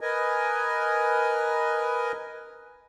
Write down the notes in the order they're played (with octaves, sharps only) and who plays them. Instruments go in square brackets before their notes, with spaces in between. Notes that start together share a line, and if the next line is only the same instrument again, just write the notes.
[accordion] A#4 B4 D#5 G#5